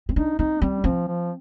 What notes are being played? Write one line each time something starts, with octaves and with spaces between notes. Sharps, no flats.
C4
D4 D#4
C4 D#4
G3 C4
F3 C4
F3